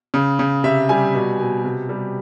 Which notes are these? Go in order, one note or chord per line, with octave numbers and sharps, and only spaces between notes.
C#3
C#3
C3 E5
G3 G#5
B2
B2
C3
G3